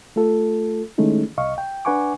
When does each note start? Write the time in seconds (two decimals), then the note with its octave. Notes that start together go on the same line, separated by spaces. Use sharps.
0.16 A3 F4 A4
0.98 D#3 G#3 A3 C#4 D#4 E4
1.38 C2 D#5 F5 C#6
1.58 G5
1.85 D4 B4 F#5 G#5 C#6 D6